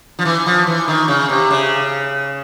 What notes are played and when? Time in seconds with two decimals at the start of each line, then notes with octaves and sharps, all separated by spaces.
0.19 F3
0.25 E3
0.46 F3
0.67 E3
0.88 D#3
1.08 C#3
1.29 C3
1.51 C#3